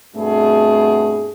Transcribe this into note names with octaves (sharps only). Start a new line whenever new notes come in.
G2 B2 A3 C4 G#4